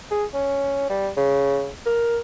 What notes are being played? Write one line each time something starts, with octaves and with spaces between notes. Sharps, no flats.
G#4
C#4
G3
C#3
A#4